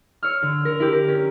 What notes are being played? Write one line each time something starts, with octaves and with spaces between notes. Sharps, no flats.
C#5 E6 F6
D3
A#4
E4 G4
A#4
C#4